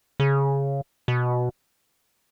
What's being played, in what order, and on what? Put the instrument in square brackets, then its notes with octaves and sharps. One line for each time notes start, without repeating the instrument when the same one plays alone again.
[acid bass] C#3
B2